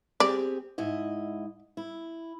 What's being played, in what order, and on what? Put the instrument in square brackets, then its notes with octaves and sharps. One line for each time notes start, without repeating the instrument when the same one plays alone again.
[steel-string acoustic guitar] C4 G4 G#4 [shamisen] D5
[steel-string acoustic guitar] G#2 E4 D#5
E4